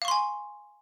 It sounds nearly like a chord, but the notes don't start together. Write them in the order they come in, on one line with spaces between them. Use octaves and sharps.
F5 C#6 C6 G#5